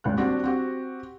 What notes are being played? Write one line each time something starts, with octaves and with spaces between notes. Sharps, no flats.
D#1 C#2 F#6
C4 D4 F#4 G4
C4 F#4 G4